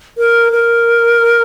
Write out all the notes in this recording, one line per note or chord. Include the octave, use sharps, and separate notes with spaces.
A#4
A#4